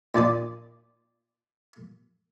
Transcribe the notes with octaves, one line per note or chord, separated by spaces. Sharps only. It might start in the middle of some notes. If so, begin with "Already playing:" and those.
A#2 D4 D5 D#6